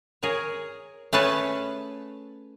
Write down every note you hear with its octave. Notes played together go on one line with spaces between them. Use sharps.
G#4 A#4 C#5
A3 C#4 G#4 B4 C#5 A5